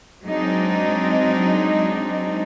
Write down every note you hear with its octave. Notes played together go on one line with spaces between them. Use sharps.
F#3 G#3 C4 D4 D#4